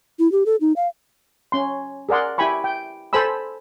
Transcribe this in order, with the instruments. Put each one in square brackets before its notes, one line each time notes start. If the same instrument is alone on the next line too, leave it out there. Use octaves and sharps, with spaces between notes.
[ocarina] E4
G4
A4
D#4
F5
[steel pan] C#4 C6
G#4 A#4 D5 F#5 C6
E4 G4 G5 G#5 B5 C#6
G5
A4 C5 G#5 B5 E6